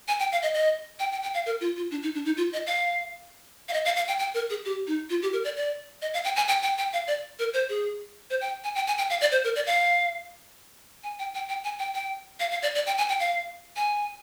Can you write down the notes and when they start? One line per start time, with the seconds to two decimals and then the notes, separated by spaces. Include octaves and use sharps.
0.08 G#5
0.19 G5
0.32 F5
0.42 D#5
0.54 D#5
1.00 G5
1.12 G5
1.23 G5
1.34 F5
1.46 A#4
1.61 F4
1.77 F4
1.91 D4
2.03 D#4
2.15 D4
2.25 D#4
2.37 F4
2.52 D#5
2.67 F5
3.69 F5
3.73 D#5
3.85 F5
3.96 F5
4.08 G5
4.19 G5
4.34 A#4
4.50 G#4
4.65 G4
4.87 D#4
5.10 F4
5.22 G4
5.33 A#4
5.44 D5
5.57 D5
6.02 D#5
6.14 F5
6.24 G5
6.36 G#5
6.48 G5
6.62 G5
6.78 G5
6.93 F5
7.07 D5
7.39 A#4
7.54 C5
7.69 G#4
8.30 C5
8.41 G5
8.64 G#5
8.75 G5
8.87 G#5
8.98 G5
9.10 F5
9.21 D5
9.32 C5
9.44 A#4
9.56 D5
9.67 F5
11.04 G#5
11.19 G5
11.34 G5
11.49 G5
11.64 G#5
11.79 G5
11.95 G5
12.40 F5
12.51 F5
12.63 D5
12.75 D5
12.86 G5
12.98 G#5
13.09 G5
13.20 F5
13.77 G#5